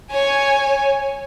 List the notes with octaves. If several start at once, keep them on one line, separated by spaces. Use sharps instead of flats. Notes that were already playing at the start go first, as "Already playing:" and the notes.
C#5 G#5